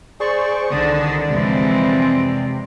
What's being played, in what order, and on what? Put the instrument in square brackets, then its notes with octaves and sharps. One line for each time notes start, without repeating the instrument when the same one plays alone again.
[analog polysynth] G#4 C5 C#6 [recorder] D5
[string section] C2 D3 D#3 [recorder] D5 [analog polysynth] D#6
[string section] F2 G#3 [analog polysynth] C3 [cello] E3 C4